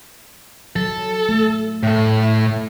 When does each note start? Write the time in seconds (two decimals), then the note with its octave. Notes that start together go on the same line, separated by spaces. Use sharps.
0.76 F#3 A4
1.29 A3
1.83 A2 A4